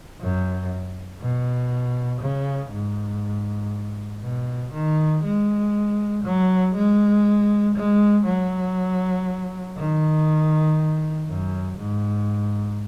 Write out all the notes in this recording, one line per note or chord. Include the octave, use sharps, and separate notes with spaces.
F#2
B2
C#3
G#2
B2
D#3
G#3
F#3
G#3
G#3
F#3
D#3
F#2
G#2